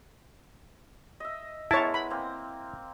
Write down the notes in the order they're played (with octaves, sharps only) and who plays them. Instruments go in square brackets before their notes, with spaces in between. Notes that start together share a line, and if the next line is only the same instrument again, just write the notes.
[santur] D#5 E5
[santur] G#3 B3 A#4 [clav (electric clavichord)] E4 [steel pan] C#5 A5
[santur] B3 [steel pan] B5
[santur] A#3 C4